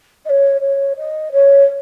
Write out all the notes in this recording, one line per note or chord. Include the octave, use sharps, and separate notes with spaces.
D#5
C#5
C#5
D#5
C#5